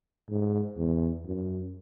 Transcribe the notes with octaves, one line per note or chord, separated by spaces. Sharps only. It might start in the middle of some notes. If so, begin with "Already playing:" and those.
G#2
E2
F#2